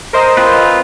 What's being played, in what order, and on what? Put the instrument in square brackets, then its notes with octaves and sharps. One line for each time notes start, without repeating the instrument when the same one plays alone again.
[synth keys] A#4 C5 D#5
[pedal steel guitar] C4 F4 B4